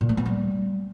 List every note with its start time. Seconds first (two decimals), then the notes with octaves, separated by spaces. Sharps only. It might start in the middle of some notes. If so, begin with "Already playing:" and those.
0.01 A#2
0.09 A#3
0.17 B3
0.26 G3